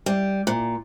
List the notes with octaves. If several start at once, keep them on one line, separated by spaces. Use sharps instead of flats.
G3
A#2